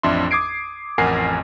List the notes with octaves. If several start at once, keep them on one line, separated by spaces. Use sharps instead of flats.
A1 F2 D4 E5 C6
D6 D#6 G#6 C7 D7
A1 F2 A#4 F#5 G#5 C7